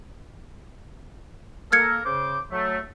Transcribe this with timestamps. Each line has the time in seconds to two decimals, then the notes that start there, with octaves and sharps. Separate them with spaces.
1.72 A#3 A4 A#4 F6 G#6 C#7
2.06 C#3 C5 D6
2.52 F#3 A3